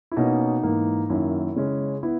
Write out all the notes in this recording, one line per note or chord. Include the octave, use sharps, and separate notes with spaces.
E4
B2 A#3 C#4 D#4
G#2 E3 A#3
F#2 D#3 A#3 E4
C#3 G#3 C#4
B3 E4